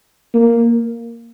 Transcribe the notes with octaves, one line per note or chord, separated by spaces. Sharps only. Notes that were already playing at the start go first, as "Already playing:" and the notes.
A#3